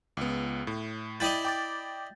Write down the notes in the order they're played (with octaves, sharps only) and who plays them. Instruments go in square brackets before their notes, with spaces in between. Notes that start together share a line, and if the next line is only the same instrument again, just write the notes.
[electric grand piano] C#2 B3
A2
[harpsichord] E4 D5 D#5 [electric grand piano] G5 G6 A6
[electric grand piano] G5 D6 A6